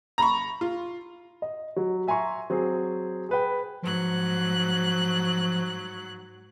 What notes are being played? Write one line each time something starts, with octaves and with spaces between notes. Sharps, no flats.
A#5 B5 C#6
F4
D#5
F#3
E5 G#5 A#5 C6 C#6
F#3 C4 G#4
G#4 B4 G5
G#2 F3 F#3 F#6